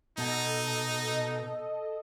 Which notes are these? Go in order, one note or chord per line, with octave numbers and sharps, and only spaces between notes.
B2 D#4 A4 D#5